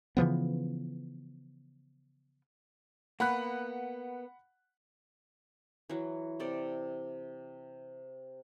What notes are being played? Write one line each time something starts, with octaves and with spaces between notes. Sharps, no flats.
C#3 E3 F3 B3
A#3 B3 F#5 B5 F#6
E3 F#3
C3 A4 D5